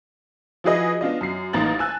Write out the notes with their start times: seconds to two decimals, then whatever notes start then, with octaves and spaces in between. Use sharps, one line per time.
0.64 F3 E4 F#4 G#4 B4 D#5
1.01 B3 D4 F4 D#5
1.21 F#2 C7
1.53 A1 A#3 D#4 A#5 A6 F#7
1.79 G#5 A5 E6 F#6